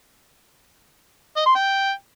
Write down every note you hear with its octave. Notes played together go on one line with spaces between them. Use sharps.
D#5
C6
G5